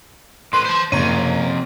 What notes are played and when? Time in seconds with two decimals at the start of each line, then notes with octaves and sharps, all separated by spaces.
0.53 A2 B4 C6
0.65 C5 A5
0.92 F#1 F2 C3 C#5 A#5 D#7